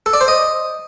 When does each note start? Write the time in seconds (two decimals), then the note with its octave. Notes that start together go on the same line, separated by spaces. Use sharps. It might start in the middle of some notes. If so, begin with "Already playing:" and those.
0.06 A4
0.13 D5
0.21 C5
0.28 D#5